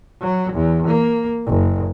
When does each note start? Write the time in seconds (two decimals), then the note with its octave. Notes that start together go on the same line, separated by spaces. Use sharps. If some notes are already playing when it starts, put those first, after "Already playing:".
0.21 F#3
0.53 E2
0.87 A#3
1.47 F#1